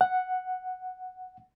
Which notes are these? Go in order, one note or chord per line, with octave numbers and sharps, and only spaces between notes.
F#5